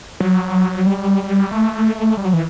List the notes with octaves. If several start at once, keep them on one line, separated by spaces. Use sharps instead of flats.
F#3
G3
A3
G3
F#3
E3